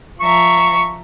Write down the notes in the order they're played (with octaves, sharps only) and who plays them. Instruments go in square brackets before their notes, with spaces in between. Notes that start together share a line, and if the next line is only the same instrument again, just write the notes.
[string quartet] F3 E5 A#5 [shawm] C#6